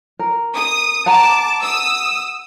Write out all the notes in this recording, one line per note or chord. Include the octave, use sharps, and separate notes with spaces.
A#4
D#6
F#5 A5 A#5 D6
D#6 E6